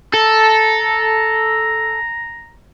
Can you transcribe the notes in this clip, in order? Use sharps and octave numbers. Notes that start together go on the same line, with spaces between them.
A4 A#5